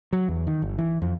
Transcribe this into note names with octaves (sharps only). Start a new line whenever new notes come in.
F#3
E2
D#3
G1
E3
F2